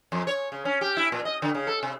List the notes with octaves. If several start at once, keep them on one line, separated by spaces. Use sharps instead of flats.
F2
C#5
C#3
C#4
G4
E4
A#2
D#5
D3
C#3
A4
C3